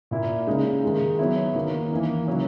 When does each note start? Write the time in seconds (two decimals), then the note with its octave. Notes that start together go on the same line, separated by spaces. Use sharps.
0.11 A#2 A#3 E4
0.47 C#3 G#3 D#4
0.83 D#3 G#3 D#4
1.19 F#3 B3 E4
1.55 D#3 A#3 D#4
1.91 E3 A#3 D#4
2.27 C#3 F#3 A#3 E4